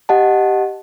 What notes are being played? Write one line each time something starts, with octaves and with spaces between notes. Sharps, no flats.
G4 D#5 F#5 A5